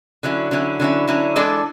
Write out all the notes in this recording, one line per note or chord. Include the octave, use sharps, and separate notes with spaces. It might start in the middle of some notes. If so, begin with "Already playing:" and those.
D3 F#3 C#4 E4
D3 F#3 C#4 E4
D3 F#3 C#4 E4
D3 F#3 C#4 E4
E3 G#3 D4 A4 D5